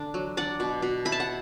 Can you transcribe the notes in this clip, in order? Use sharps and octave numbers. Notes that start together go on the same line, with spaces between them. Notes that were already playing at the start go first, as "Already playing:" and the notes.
Already playing: D3 D4
F#3
D4 D5 F#5
B2
B2
E4 B5
A5
F#5